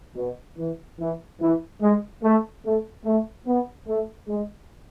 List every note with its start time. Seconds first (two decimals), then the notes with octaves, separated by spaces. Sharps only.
0.15 B2
0.57 E3
0.98 E3
1.40 E3
1.80 G#3
2.22 A3
2.64 A3
3.04 A3
3.46 B3
3.87 A3
4.28 G#3